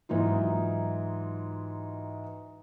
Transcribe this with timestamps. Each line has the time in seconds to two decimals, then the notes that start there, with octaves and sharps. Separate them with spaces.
0.09 G#2 E3 F#3 D#4 F4